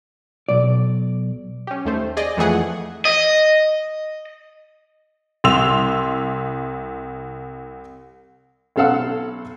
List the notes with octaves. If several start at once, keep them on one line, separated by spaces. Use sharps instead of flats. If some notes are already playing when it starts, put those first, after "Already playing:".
B1 D5
C#4 G4
D#2 A3 C5
G#4 D5 D#5
F2 E3 A3 G#4 F#5
D#5
C2 C6 E6 F7
B1 C#4 A4 F5 F#5 E6